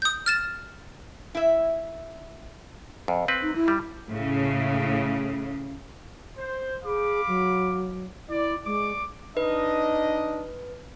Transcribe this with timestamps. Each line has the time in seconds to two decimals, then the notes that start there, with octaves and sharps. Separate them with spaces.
0.02 D#6 G6
0.26 F6 A6 E7
1.35 E4 E5
3.08 F2
3.28 C4 B4
3.42 D#4
3.55 E4
3.68 G3
4.08 A2 C#3
6.38 C5
6.85 G#4 F5 B5 D6
7.27 F#3
8.29 E4 D5
8.65 G#3 D5 C#6 D6
9.37 D4 D#4 B4 D#5